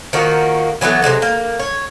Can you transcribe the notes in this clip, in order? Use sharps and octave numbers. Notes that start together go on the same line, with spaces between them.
D#3 F3 A#3 F#4
E3 F#3 A3 B3
C3 F3 F#3 G#3
A#3
C#5